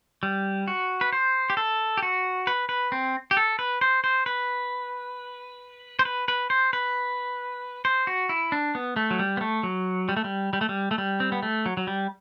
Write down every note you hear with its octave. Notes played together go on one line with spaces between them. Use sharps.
G3
F#4
B4
C5
G4
A4
G4
F#4
B4
B4
C4
G4
A4
B4
C5
C5
B4
C5
B4
B4
C5
B4
C5
F#4
E4
D4
B3
A3
F#3
G3
B3
A3
F#3
G3
A3
G3
G3
A3
G3
A3
G3
C4
B3
A3
F#3
F#3
G3